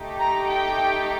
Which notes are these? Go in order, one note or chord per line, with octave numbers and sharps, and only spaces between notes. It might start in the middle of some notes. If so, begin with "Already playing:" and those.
Already playing: A3 D#4 G4
A#5
G5